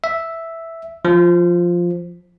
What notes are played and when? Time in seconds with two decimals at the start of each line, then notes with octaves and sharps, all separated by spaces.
0.04 E5
1.05 F3